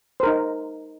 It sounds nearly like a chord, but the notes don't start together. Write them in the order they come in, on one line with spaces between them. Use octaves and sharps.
C5 A#4 D#4